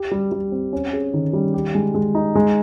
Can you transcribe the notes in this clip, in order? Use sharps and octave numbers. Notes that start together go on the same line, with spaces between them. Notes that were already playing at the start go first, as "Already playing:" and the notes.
Already playing: G4
G3
G3
C4
C#4
G#4
D#3
G3
G4
G#3
G#3
D#4
G#3